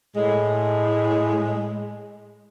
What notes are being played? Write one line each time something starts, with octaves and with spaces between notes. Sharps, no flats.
A2 G#3